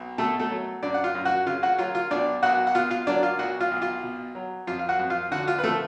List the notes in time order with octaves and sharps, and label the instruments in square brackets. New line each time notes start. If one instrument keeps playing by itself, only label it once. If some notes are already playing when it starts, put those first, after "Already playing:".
Already playing: [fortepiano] B1
B2 A3 A4
A3 A4
F#3
F#2 D4 D5
F#5
F4 F5
F#2
F#4 F#5
C#3 F4 F5
F#4 F#5
F#3 F4 F5
F4 F5
B1 D4 D5
B1 F#4 F#5
F#5
B2 F4 F5
F4 F5
F#3 D4 D5
F4 F5
B1 F#4 F#5
F4 F5
B1
F4 F5
B2
F#3
F2 F4 F5
F5
F#4 F#5
F2
F4 F5
D3 F#4 F#5
F4 F5
B4
F3 A3 A4